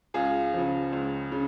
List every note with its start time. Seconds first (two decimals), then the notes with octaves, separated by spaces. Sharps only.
0.14 C#2 F4 G#4
0.54 C#3 F3
0.93 C#2
1.32 C#3